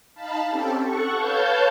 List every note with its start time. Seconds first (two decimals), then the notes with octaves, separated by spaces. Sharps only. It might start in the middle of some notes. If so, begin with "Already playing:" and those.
0.14 D#4 F5 A5 B5
0.49 C4 C#4 G4 A4
0.81 A4 F#5 C#6
1.14 B4 C#5 F5 A5 G6